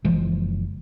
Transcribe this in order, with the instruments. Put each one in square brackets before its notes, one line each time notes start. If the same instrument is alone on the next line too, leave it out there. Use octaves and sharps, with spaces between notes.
[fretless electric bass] F#1 E3 F3 G#3